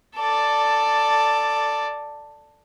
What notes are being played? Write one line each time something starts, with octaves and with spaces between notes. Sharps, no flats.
A4 D5